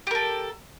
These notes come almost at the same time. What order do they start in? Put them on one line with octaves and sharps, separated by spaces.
G4 A#4 A4